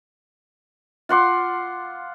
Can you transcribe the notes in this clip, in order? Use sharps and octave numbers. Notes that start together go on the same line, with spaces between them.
F4 F#5 C6 D6